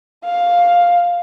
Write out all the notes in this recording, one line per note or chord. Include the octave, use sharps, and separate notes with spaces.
F5